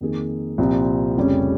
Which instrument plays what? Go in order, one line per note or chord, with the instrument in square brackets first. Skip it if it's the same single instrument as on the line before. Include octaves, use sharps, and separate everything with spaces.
[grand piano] F2 D#3 A#3 D#4 G#4
C2 A#2 F3 C4 F4
F1 F2 C#3 G3 C#4